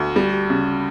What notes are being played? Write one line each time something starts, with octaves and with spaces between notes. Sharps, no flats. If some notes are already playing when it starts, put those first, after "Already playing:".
Already playing: D2
G3
C#3